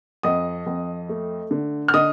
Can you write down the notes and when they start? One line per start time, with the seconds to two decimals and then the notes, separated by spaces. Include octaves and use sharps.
0.23 F2 D#5 D#6
0.66 F2
1.09 A3
1.51 D3
1.88 F6
1.94 D3 D#5 D#6